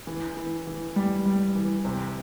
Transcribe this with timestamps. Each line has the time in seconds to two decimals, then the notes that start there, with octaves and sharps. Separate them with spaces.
0.07 E3
0.37 E3
0.67 E3
0.96 G3
1.26 G3
1.55 E3
1.85 C3